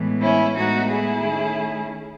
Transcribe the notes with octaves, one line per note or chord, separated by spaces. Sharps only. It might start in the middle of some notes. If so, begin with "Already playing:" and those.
Already playing: A2 E3 G#3 B3
C#4 E4
A2 G#3 B3 D#4 F#4
E4 G#4
D#3 A3 C#4